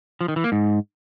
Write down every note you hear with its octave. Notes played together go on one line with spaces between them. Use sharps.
F3
D#3
E3
A#3
G#2